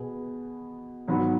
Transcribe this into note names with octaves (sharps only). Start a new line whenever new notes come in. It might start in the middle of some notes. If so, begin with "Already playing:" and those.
Already playing: B2 B3 G#4
G#2 F#3 B3 F#4 B4